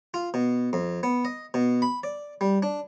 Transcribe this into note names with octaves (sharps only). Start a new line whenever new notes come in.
F4
B2
F2
B3
D#5
B2
B5
D5
G3
D4